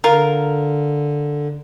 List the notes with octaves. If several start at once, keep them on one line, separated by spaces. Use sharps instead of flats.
D3 F4 A#4